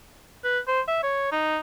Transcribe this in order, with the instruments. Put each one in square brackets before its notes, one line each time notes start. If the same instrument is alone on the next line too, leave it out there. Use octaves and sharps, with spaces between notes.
[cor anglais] B4
C5
E5
C#5
D#4